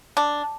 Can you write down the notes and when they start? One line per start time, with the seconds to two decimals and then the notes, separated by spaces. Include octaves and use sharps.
0.17 D4